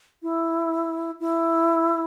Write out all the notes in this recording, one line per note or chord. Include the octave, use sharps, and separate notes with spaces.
E4
E4